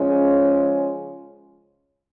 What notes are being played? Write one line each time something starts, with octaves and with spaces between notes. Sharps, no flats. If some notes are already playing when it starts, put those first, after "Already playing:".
Already playing: C#3 F3 G#3 C#4